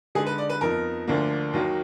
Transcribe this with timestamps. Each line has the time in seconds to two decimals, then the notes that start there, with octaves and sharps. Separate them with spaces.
0.15 D3 G#3 D#4 G#4
0.26 B4
0.38 D5
0.49 B4
0.61 F2 F3 B3 D#4 A#4
1.07 D2 D3 F3 A#3 D4
1.53 D#2 D#3 F#3 A#3